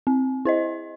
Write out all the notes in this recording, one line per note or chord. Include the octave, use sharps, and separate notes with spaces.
C4
E4 C5 D#5